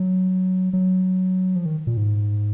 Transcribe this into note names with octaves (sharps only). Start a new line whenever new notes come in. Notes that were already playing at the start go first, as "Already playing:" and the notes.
Already playing: F#3
F#3
F3
D#3
A#2
G#2